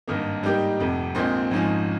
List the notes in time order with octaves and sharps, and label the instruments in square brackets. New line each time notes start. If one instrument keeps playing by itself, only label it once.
[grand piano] G#1 G2 D#3 A#3 D#4
G#2 G3 A#3 D#4 G4
F1 F2 C3
A#1 A#2 G#3 C4
G#1 G#2 F3 G#3 C#4